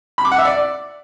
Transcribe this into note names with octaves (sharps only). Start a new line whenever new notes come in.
B5
D6
F#5
E5
D5